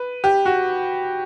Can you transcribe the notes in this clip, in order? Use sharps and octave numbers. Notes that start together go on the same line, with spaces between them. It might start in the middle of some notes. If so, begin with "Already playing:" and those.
Already playing: B4
G4
F#4